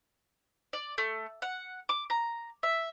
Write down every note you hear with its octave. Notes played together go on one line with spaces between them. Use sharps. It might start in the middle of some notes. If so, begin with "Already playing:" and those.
D5
A3
F#5
D6
A#5
E5